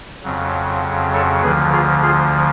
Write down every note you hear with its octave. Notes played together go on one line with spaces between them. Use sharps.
F2 C#3 F#3
A4 C#5
D2 D3 F3 G#4 B4
F4 G#4
F4 G#4